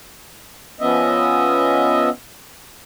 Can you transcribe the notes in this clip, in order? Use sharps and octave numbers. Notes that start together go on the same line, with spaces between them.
F3 B3 C#4 D#5 E5